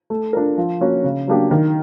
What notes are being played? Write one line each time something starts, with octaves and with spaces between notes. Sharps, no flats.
A3
D4 F4 A#4
F3
A#3 C#4 F#4
C#3
F#3 A#3 D4 G4
D#3